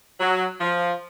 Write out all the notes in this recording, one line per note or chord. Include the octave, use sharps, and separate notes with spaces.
F#3
F3